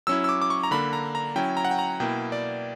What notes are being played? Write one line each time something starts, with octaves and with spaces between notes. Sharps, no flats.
F#3 C#4 E4 E6
E6
D6
D6
C#6
A#5
D3 A#3 D4 B5
A#5
A#5
F#3 C#4 E4 G5
A#5
F#5
G5
A#5
B2 A#3 E4 G5
D5